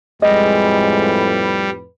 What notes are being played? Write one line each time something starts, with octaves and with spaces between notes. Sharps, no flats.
F2 A2 G3 G#3 B4 D#5